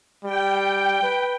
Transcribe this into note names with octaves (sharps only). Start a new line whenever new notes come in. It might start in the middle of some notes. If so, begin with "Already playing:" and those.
G3 G5
B4